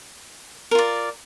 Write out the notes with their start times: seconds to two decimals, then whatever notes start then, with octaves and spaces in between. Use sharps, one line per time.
0.71 A#4
0.75 F4
0.79 D5